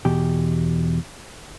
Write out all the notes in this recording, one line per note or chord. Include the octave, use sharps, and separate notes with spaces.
E2 B2 G4